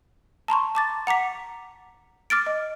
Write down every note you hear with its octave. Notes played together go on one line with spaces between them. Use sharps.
A5 A#5 C6 C#6
A5 D6 A6
F#5 A#5 D6 B6
D6 F6 A6 D7
D#5